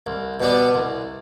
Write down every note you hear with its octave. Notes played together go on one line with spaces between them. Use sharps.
C2
B2 G3 B3 D4
C2